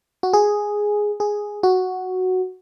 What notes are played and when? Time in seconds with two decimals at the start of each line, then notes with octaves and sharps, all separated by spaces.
0.23 F#4
0.33 G#4
1.20 G#4
1.63 F#4